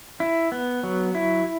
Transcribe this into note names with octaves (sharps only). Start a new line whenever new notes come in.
E4
B3
F#3
E4